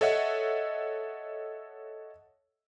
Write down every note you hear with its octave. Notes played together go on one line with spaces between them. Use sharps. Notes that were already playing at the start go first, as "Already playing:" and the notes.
A4 C#5 D#5 E5 F#5